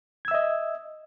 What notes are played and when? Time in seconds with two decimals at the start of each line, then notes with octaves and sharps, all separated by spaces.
0.25 G#6
0.28 E6
0.31 E5
0.34 D#5